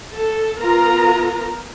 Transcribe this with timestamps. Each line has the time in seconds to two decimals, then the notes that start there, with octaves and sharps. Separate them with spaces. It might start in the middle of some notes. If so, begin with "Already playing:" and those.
0.14 A4
0.58 B3 F4 A#4 A#5